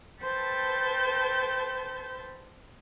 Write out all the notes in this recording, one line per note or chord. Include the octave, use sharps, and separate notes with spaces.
A4 B4 C5 G5 A5 G6